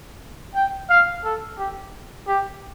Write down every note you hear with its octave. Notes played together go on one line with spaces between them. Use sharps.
G5
F5
A4
G4
G4